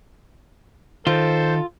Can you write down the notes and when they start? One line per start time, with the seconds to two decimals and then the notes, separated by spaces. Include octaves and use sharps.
1.07 D#3 F4 A4 C5